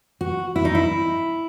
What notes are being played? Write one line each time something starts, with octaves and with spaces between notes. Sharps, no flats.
F#4
E4
D#4
E4